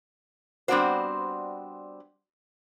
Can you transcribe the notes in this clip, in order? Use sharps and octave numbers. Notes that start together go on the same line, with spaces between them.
G3 B3 C4 D4 F#4 C5